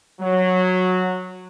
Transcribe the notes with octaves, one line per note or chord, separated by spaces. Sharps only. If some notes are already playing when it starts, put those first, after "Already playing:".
F#3